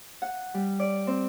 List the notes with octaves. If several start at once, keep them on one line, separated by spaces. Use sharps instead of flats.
F#5
G3
D5
C4